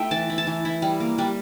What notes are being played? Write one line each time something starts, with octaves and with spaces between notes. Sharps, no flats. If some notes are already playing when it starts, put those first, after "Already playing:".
Already playing: A3 E4 E5 G5
E3 A5
E4
A5
E3
E4
G3
A#3
G3